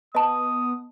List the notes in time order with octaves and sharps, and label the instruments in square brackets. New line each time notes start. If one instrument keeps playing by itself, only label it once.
[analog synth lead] B3 [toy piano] D#5 A5 [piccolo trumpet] D#6